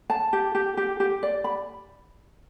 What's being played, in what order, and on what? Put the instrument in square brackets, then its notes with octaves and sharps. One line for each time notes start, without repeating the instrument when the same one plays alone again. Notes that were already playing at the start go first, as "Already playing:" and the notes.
[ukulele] A5
G4
G4
G4
G4
D5
B5